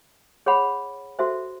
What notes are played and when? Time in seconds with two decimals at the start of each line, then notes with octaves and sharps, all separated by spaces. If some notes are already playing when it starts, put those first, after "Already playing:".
0.46 G#4 C#5 F#5 B5
1.19 F#4 A4 C5 E5